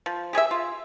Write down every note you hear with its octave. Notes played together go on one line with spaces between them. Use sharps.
F3
G4 G#4 D5 E5
F4